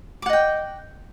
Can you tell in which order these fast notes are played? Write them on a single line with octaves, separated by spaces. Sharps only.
D6 F#5 D#5 G5